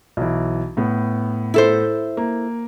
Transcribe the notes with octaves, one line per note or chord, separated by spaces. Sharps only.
B1 E3
A2 B3
E4 A4 C5
A#3